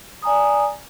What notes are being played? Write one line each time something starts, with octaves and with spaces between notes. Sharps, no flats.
D5 G#5 A#5 D#6